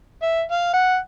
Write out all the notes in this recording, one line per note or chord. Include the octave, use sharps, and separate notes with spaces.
E5
F5
F#5